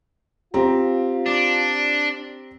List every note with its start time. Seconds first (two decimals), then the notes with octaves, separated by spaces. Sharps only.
0.54 C4 F4 G4 A#5
1.26 D4